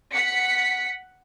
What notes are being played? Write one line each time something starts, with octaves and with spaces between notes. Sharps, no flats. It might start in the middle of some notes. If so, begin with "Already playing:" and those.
F#5 B6 C#7